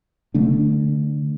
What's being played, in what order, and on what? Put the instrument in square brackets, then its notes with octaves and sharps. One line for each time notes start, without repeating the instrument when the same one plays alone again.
[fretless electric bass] D3 A3 D4